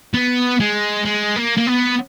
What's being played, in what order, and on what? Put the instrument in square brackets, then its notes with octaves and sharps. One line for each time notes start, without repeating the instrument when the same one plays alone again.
[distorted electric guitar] B3
G#3
G#3
A#3
A#3
B3